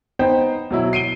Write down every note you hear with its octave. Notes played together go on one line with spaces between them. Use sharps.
B3 D#4 C5 G5
B2 F#3 E4 F#4
C7 D7 D#7 G7